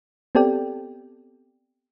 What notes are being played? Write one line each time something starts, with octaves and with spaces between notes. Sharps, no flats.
B3 C4 G4 A4 D5 G5